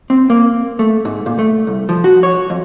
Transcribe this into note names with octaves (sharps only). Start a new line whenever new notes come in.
C4
A#3
A3
G#2
A#2
A3
C2
F3
F#4
C#5
F2